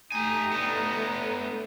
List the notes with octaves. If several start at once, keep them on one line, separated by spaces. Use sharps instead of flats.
A3 D#4 G4 G#5 A#5
B3 D4